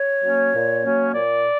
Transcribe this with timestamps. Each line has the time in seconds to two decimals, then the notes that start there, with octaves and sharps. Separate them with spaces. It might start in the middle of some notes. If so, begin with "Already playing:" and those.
Already playing: C#5
0.23 F#3 A#3 C#4
0.54 A#2
0.84 F#3 A#3 C#4
1.14 A#2 D5